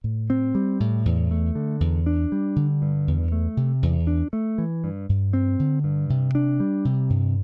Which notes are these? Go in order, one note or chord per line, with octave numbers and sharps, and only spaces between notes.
A2
C4
G3
A2
E2
A3
D3
E2
D4
G3
D3
G2
E2
A3
C3
E2
D4
A3
E3
G2
G2
C4
D3
G2
C3
D4
G3
C3
G2